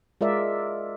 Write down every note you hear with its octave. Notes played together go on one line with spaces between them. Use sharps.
G#3 F4 A#4 D5 E5